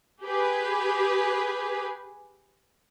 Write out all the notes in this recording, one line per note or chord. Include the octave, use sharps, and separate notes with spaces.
G4 G#4 B4